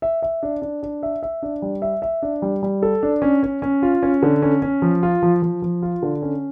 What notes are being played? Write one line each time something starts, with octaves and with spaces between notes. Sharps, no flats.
E5
E5
D4
D4
D4
E5
E5
D4
G3
E5
E5
D4
G3
G3
A4
D4
C#4
C#4
C#4
F4
C#4
D3
C#4
C#4
F3
F4
F3
F3
F3
F4
D3
C#4